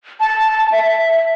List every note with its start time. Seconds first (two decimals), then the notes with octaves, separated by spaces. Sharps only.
0.20 A5
0.72 E5